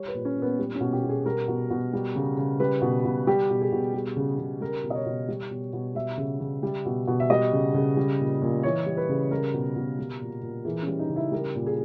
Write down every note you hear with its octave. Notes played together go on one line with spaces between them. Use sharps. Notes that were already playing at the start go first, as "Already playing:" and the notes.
Already playing: G3 C#5
B4
A#2
C#4
A#2
B3
G3
C#4
B2
G4
B2
G#4
G3 A#4
B2
B2
G3
C#3
C#3
G3 B4
B2
B2
G3 G4
B2
G#4
B2
G3
C#3
C#3
G3 A#4
B2
D#5
C#5
B2
G3
B2
B2
G3 E5
C#3
C#3
G3
B2
B2
E5
G3 D#5
C#3
C#3
G3
A#2
A#2
E3 C#5
G3
B4
C#3
G3 A#4
B2
B2
G3
A#2
A#2
E3 G#4
C#4
G3
D#4
C#3
E4
G3 A#4
A#2
G#4